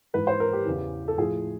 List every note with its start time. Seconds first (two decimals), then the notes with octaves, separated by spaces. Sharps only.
0.14 G#2 E3 B4
0.27 C5
0.40 A#4
0.53 G4
0.65 E2 C#3 E3
1.08 A4
1.17 A2 F3 G#4